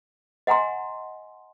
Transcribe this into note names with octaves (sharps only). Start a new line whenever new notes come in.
D#5 F#5 G#5 A#5 C6